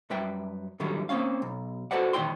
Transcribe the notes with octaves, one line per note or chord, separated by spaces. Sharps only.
F#2 G3 B4 E5 G5
A2 D3 D#3 F#3 G3
A#3 C4 C#4 F5
B1
F#4 A4 B4 C5 D5 F#5
F2 A#2 D#3 E3 G5 C6